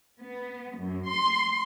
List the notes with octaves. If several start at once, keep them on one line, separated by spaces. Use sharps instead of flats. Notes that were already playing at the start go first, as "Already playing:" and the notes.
B3
F#2
C6